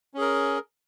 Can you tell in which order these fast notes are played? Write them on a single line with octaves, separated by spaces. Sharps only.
C#4 G#4 A#4